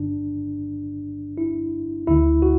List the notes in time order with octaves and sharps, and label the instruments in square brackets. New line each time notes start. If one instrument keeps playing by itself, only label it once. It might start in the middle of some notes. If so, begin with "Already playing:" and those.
Already playing: [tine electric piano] G1 G2 D3 D4
E4
D2 D3 E4
F#4